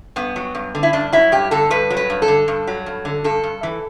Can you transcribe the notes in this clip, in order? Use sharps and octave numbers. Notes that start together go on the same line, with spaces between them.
G2 B3
F#3
G2
D3
E4
G2 D4
F#3 E4
G2 G4
D3 A4
G2 B4
F#3
B4
G2
A4
D3
G2
F#3
G2
D3
G2 A4
G2
E3